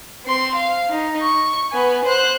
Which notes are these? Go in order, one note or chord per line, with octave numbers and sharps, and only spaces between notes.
C4 C6
F5
D#4
C#6
B3 G#5
C5 F#6